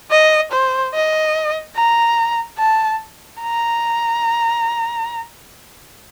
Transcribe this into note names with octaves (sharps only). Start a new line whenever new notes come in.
D#5
C5
D#5
A#5
A5
A#5